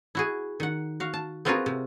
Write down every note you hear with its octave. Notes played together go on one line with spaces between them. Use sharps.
E4 F#4 G#4
D#3 F#5
F#4 F5
A5
B3 C4 F4 F#4 G#4 A#4
C3